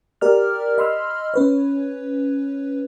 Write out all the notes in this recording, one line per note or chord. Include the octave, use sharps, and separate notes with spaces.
G4 A#4 D5 F6
D#5 B5 C6 E6 F6
C#4 B4 C#5